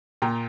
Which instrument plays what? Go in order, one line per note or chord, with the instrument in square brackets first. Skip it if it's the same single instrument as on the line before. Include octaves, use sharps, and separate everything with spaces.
[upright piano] A#2 G5 A#5